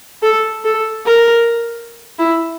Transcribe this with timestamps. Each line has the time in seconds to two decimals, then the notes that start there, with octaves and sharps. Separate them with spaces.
0.22 A4
0.64 A4
1.06 A#4
2.19 E4